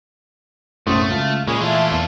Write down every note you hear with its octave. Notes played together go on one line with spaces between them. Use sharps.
B1 F#2 A2 A3 C4 C#4 D#6
C#2 F4
A#2 G#3 C#4 G#4 B5
E3 A3 D4 F4 C6
E2